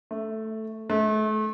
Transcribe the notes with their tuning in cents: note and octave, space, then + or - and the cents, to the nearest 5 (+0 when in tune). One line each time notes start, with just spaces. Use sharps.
A3 +0
A3 -35